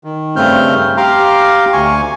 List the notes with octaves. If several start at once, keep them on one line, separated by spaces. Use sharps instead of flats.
D#3
G2 C#3 A3 C4 F6 G6
G4 F5 A#5 C6 D6
D2 G#5 C#6